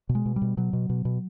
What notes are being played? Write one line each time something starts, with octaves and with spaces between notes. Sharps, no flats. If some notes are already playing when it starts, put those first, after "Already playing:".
B2
G#3
B2
G3
B2
B2 F#3
B2
B2
B2